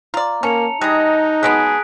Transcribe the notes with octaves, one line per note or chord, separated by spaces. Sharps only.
F4 D5 A#5
A#3 C#4 A5 C#7 F7
G3 D#4 G#4 D#5 F#6 A#6
F#3 G#3 B3 G#4 F#6 B6 D7